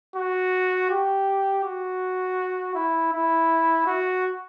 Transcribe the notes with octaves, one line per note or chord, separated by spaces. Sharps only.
F#4
G4
F#4
E4
E4
F#4